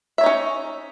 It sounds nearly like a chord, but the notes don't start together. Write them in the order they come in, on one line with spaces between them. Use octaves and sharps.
E5 C#5 D#4 C#4